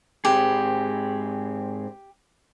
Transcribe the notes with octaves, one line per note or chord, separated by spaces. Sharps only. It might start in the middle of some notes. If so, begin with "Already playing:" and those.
G#2 C4 G4 G#4